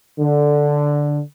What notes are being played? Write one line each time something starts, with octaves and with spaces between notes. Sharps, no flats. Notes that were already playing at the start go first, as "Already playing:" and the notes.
D3